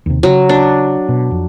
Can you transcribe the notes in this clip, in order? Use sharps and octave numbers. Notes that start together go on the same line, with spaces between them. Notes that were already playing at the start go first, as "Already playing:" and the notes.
D#2 C3
C#3 F#3
D4
B2
F2